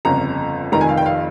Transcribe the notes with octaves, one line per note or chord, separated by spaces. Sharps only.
G1 F2 C#3 A#5
F1 F2 D#3 A#5
G#5
F5
G5
F5